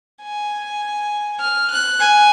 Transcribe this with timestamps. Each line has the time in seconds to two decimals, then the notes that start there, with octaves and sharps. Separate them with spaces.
0.23 G#5
1.40 F6
1.70 F#6
2.00 G#5